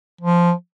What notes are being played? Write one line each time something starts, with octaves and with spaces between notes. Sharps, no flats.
F3